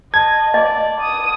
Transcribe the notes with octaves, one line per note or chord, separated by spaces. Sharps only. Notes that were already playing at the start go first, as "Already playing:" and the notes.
D#5 A5 G#6
D5 D#5
D#6